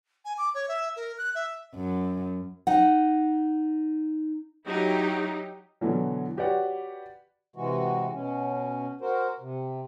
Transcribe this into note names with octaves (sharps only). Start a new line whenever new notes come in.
G#5
D6
C#5
E5
A#4
F#6
E5
F#2
D#4 F#5
F#3 D#4 E4 G4
B2 D3 E3 F#3
F#4 G4 B4 C#5 D5 F#5
C3 E3 G#3 F#4
B2 C#4
F#4 A#4 C5
C3